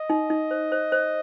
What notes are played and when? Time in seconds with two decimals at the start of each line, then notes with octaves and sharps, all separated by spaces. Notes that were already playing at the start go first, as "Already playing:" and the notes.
Already playing: D#5
0.10 D#4
0.30 D#4
0.51 C5
0.72 C5
0.92 C5